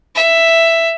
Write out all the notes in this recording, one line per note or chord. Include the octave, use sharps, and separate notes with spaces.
E5